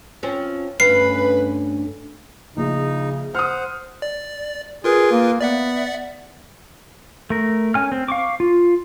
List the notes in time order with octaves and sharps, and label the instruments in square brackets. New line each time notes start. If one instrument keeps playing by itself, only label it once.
[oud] F3 C4 C#4
[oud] D2 F5 [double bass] G2 C#4 [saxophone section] B4 [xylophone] C7
[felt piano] A#1 [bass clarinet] C#3 [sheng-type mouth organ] D#4
[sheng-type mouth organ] C5 F#5 [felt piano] D#6 F6
[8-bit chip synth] D5
[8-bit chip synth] F4 A#4 B4 [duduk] G#4
[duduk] A#3
[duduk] B3 [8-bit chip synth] D5 E5 F#5
[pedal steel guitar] A3 A#4
C#4 G#5 F6
C4
F5 C#6 D6
F4